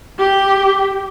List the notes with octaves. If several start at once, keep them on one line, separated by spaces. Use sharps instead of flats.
G4